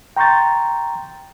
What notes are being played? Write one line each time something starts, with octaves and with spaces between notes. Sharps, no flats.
G5 A#5 C6 C#6 G6 A6